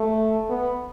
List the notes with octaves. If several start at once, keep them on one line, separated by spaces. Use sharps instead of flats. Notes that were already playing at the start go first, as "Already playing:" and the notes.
Already playing: A3
B3